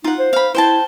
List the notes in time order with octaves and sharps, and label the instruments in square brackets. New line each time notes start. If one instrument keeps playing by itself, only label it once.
[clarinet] D#4 [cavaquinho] F4 F#5
[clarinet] C5
[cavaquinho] F5 B5
[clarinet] E4 [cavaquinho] C5 G5 A5